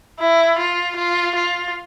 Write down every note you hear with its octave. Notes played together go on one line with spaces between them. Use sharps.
E4
F4
F4
F4